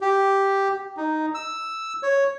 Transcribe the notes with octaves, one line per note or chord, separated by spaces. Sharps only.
G4
D#4
E6
C#5